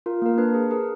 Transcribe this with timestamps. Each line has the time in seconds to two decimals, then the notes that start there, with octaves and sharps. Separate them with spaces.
0.06 F4 A#4
0.22 A#3 A#4
0.38 D4 B4
0.55 G#4
0.71 G#4 A#4